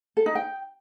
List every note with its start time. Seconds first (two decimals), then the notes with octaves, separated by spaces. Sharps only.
0.17 A4
0.26 D#4
0.35 G5